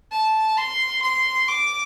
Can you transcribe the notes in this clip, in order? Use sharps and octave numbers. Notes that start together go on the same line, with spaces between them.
A5
C6
C6
D6